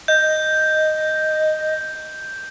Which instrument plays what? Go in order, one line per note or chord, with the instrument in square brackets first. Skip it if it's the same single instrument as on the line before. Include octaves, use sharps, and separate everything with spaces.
[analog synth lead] D#5 [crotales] G6